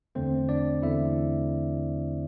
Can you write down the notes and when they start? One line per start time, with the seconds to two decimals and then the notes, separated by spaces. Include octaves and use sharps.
0.15 E2 D3 A3 C4 C5
0.48 D4 D5
0.82 E2 D3 A3 E4 E5